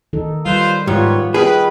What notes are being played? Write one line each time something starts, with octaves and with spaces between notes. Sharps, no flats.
D#3 D#4 A4
G3 F4 B4 C5
G#2 G3 B3 F4 G4 C#5
D#3 G#4 B4